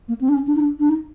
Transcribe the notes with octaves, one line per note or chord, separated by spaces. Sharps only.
A#3
C4
D4
C#4
D4
D#4
D4
D4
D#4